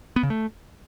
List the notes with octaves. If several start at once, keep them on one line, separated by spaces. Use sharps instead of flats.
B3
C#3
A3